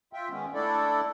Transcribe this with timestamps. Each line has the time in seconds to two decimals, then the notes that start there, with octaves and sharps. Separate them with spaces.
0.13 F4 E5 G5
0.30 D#3 G#3 B3 C#4
0.54 A3 D4 E4 A4 D5